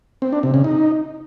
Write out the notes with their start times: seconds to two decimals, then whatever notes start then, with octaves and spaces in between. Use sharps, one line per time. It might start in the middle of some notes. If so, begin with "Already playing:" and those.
0.22 C4
0.33 D4
0.43 C3
0.54 C#3
0.64 D#4